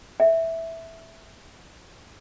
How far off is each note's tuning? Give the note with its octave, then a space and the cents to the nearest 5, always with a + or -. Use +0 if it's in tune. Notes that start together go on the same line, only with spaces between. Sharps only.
E5 -5